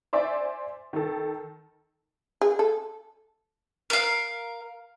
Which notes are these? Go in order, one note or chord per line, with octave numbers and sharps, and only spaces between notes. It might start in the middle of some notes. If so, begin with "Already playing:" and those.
C5 D5 E5 G#5 C6
D#3 A4
G#4
A4
A#4 F5